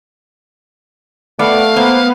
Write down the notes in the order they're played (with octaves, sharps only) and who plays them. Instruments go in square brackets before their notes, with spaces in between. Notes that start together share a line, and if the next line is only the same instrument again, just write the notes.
[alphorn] A3 [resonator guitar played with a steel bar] B3 D5 [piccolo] F5
[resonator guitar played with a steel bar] A#3 C5 [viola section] B3